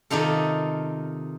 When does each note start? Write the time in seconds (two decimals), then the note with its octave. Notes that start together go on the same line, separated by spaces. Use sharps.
0.10 C3 D#3 D#4 F4 A4